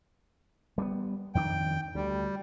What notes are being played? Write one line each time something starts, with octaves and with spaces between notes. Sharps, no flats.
G3 A#3 B3
F2 D#3 D4 G5
D2 G3